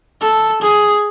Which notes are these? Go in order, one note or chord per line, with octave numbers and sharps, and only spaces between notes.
A4
G#4